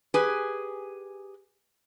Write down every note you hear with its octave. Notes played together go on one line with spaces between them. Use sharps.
G4 G#4 B4 G#5